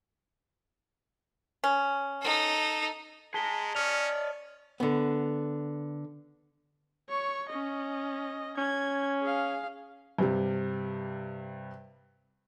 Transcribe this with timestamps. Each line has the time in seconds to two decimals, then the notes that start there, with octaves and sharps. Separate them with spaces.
1.64 C#4
2.22 D#4 A4
3.34 G#3 G#4 A5 A#5 B6 G7
3.75 C#4 C#5 D5 D#6 F6 F7
4.80 D3 B3
7.09 C#5 C#6
7.49 C#4 D#5
8.58 C#4 G#6
9.22 G#4 F5
10.18 G2 C3 G3